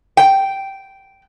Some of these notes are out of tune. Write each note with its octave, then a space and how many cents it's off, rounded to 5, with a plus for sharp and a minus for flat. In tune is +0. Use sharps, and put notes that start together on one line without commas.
G5 -10